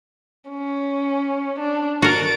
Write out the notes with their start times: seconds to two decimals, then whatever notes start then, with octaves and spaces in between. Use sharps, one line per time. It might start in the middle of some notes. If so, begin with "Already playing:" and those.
0.50 C#4
1.59 D4
2.02 F#4 A#4 A6 D7